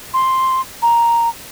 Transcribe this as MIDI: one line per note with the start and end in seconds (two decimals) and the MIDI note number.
0.14 0.61 84
0.82 1.29 82